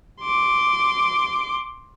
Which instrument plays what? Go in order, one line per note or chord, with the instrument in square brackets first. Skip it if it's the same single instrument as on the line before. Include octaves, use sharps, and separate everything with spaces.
[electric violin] C6 D6